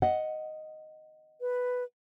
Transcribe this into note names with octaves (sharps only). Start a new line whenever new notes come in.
D#5 F#5
B4